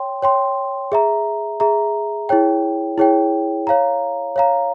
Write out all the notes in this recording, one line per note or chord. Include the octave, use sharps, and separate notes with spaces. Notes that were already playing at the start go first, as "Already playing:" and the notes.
Already playing: C#5 G5 C6
C#5 G5 C6
G#4 E5 A#5
G#4 E5 A#5
E4 G#4 C#5 G5
E4 G#4 C#5 G5
C#5 F5 A#5
C#5 F5 A#5